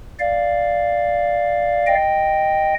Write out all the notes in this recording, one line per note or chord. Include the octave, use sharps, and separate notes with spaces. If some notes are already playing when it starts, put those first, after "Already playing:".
D5 F5
D#5 G5